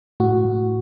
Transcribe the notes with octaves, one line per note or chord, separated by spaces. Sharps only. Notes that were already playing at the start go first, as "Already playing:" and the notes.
A2 F#4
A2